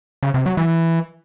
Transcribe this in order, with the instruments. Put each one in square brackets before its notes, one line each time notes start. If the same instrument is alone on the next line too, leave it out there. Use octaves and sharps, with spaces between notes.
[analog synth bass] C#3
C3
F#3
E3